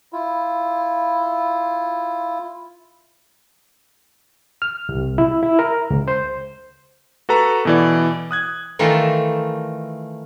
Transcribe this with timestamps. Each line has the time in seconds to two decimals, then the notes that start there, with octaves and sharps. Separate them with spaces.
0.13 E4 F4
4.62 F6
4.89 C2
5.18 E4
5.43 E4
5.59 A#4
5.90 C#2
6.08 C5
7.29 F#4 A4 B4 A#5
7.65 B2 E3 D5
8.31 D#6 F#6 G#6
8.79 D#3 E3 A3 F4 A4 A#4